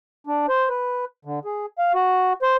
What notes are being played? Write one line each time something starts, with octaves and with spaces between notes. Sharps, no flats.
D4
C5
B4
D3
G#4
F5
F#4
C5